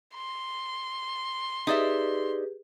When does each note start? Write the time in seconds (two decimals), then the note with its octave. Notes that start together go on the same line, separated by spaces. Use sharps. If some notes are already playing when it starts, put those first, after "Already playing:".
0.15 C6
1.67 D#4 G4 G#4 B4 D5 E5